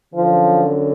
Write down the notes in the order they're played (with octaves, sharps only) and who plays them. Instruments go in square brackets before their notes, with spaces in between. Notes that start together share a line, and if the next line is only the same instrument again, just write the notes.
[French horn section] F#2 D3 F3